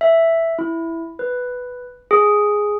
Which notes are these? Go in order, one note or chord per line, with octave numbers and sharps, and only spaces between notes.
E5
E4
B4
G#4